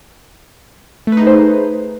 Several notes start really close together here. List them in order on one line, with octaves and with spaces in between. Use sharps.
A3 B4 D#4 G#4 C5